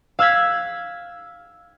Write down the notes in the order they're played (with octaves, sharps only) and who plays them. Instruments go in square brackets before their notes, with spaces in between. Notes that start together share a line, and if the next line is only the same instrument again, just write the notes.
[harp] F5 E6 F#6 G#6 B6